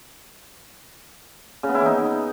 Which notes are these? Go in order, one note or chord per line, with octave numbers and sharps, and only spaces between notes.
C#3
B3
E4
E3
D#4